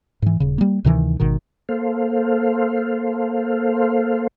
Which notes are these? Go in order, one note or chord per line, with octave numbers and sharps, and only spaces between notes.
G#2 E3
D#1 C#3
G3 A#3
D2 C3 D#3 E3
G#1 B2 D#3
A#3 A4 C5 F5